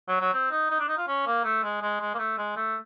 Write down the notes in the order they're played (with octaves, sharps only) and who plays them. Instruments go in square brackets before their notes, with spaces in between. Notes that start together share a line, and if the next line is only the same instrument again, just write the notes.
[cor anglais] F#3
F#3
C4
D#4
D#4
D4
D#4
F4
C#4
A#3
A3
G#3
G#3
G#3
A#3
A3
G#3
A3